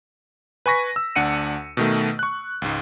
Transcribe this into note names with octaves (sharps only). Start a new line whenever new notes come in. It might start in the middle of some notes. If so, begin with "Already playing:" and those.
B4 G#5 C#6 A#6 B6
E6
D2 D4 F#5 C#7 D#7
B2 D#3 A3
C#6 F#6
C#2 G#2